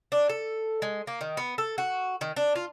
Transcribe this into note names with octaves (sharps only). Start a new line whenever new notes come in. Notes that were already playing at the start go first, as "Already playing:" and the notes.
D4
A4
G#3
A#3
D#3
B3
A4
F#4
D#3
D4
F4